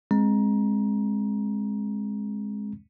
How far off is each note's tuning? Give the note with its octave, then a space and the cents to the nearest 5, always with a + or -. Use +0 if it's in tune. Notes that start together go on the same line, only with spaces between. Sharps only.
G#3 +0 C4 +25 A#5 +20